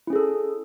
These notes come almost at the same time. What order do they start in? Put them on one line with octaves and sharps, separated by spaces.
E4 C#4 G#4 A4